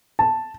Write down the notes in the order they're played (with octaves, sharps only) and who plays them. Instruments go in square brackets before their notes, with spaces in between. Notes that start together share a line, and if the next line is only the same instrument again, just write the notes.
[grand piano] A5